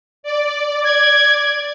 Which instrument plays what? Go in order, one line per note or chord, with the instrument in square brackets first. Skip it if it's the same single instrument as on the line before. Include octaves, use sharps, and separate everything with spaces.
[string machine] D5
[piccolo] G#6